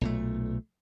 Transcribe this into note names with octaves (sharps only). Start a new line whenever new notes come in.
B1 A#2 A3